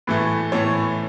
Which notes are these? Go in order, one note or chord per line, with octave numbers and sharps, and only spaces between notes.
A2 E3 A3 B4
A2 E3 A3 C#5